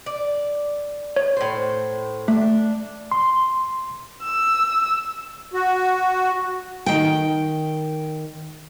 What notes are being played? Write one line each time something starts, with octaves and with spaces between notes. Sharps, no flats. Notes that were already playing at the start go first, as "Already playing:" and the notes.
D5
C#5
A2 C5
A3 D4
C6
E6
F#4
D#3 G5